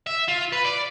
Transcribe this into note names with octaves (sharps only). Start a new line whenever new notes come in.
E5
F4
B4
D5